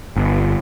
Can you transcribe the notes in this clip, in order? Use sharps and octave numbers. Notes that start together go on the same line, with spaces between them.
G1